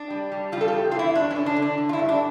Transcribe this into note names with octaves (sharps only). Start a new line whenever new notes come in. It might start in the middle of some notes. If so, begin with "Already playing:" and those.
Already playing: D4
G3
G3
G3 F4
A4
G4
E2
E3 F4
E4
G2 D4
C#4
D3
D4
D3
D4
D3
F4
E4
G2
D4